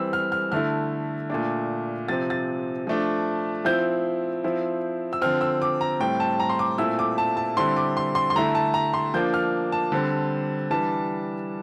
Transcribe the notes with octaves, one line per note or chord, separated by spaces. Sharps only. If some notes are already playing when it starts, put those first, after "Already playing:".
Already playing: E3 G3 C4 E6
F6
F6
D3 A3 E4 F6
A#2 A3 D4
C3 F3 C4 A6
A6
F3 A3 D4
F3 C4 E4 G6
F3 C4 E4
E6
D3 F3 C4 F6
E6
D6
A#5
A2 G3 C4 G5
A5
A#5
C6
D6
A#2 A3 C4 E4 E6
D6
A5
A5
D3 G3 C4 E4 C6
D6
C6
C6
C6
D3 A3 E4 A#5
A5
A#5
C6
F3 A#3 D4 G6
F6
A5
D3 G3 C4
E3 G3 D4 A5